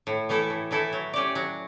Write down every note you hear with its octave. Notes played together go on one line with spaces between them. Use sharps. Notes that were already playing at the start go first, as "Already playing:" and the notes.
A2
E3 A3 E4 A4
A2
E3 A3 E4 A4
F#3
C#4 G4 D5
F#3